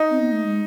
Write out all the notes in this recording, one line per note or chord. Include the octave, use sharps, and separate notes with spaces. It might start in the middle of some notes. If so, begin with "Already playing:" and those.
Already playing: D#4
C4
B3
A3
G#3